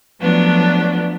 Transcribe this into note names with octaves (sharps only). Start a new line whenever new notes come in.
F3 F#3 A3 B3 D4